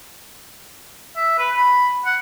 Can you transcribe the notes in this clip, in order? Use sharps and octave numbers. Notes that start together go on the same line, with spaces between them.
E5
B4
B5
F#5